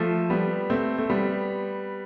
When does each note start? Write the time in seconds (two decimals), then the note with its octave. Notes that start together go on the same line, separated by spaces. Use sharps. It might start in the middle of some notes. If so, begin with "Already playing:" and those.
Already playing: F3 A3
0.30 G3 B3
0.70 A3 C4
0.98 A3
1.10 G3 B3